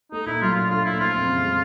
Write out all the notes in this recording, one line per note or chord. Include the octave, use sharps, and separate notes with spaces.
A3 D#4
A#2 E4
F#3 F4
D4 F4
A3 F4
A#2 E4
F3 F4
F2
C#3
G#3